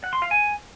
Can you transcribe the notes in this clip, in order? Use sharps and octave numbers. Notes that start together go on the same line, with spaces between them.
F#5
C6
F5
G#5